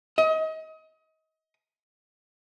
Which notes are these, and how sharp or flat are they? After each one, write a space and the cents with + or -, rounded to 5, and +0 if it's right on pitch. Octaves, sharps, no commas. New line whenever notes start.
D#5 +30